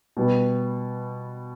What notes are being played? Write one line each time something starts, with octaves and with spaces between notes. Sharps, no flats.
B2 G3 B3